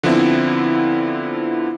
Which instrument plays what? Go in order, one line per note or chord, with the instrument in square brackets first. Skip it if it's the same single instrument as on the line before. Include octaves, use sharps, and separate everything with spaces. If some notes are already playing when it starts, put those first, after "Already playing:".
[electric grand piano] D3 F3 B3 C4 E4